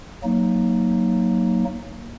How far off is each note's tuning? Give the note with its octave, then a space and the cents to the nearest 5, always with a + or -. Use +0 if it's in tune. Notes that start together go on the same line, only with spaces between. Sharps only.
F#3 +0 A#3 +0 D#4 -5